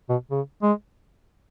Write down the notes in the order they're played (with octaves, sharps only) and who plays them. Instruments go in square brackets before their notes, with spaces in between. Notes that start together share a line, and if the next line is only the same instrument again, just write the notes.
[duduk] B2
C#3
G#3